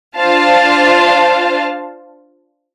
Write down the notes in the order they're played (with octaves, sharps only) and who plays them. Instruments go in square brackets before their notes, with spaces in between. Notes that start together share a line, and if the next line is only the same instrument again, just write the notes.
[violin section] D4 F4 C5 F5 A5